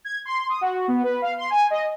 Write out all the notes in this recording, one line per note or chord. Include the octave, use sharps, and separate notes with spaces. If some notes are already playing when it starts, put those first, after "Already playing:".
G#6
C6
D#6
F#4
B3
B4
F5
C6
G#5
D#5